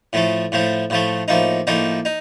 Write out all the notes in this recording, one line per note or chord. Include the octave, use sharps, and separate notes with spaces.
A2 F3 A3
A2 F3 A3
A2 F3 A3
A2 F3 A#3 D#4
A2 F3 A#3 D#4
D#4